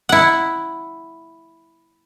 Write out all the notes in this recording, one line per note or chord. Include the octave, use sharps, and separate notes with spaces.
E4 F#5